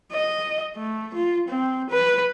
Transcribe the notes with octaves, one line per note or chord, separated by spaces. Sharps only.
D#5
A3
F4
C4
B4